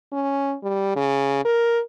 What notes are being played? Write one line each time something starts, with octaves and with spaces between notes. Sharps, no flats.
C#4
G3
C#3
A#4